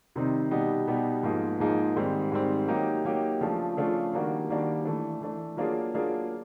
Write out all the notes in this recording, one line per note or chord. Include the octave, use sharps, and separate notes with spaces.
C3 D#3 G3 C4 D#4
B2 G3 B3 D#4 G4
B2 G3 B3 D#4 G4
G#2 F3 A#3 D#4 G#4
G#2 F3 A#3 D#4 G#4
G#2 D#3 G3 C4
G#2 D#3 G3 C4
F#3 A#3 D#4 G4
F#3 A#3 D#4 G4
C#3 F3 A3 D4 F4
C#3 F3 A3 D4 F4
D#3 G3 A#3 D4 F#4
D#3 G3 A#3 D4 F#4
E3 A3 D4
E3 A3 D4
F#3 A#3 D4 F4 G#4
F#3 A#3 D4 F4 G#4